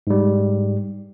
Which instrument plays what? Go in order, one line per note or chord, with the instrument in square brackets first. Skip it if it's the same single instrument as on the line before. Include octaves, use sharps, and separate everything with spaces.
[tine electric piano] G#2 G3